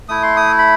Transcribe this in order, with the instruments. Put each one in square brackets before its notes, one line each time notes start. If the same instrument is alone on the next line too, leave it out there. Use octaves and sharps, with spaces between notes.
[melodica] A3 E4 D#6
C6
D#6
B5